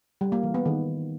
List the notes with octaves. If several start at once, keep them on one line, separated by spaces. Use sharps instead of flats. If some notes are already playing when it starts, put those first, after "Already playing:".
G3
A#3
E3
B3
D#3